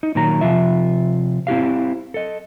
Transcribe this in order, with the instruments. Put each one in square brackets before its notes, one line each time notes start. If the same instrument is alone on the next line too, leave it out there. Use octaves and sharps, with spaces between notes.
[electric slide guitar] D#4
A#2 D#3 F#3 A#5
C3 F3 F4 E5
C4 E4 G4 F5
A4 D#5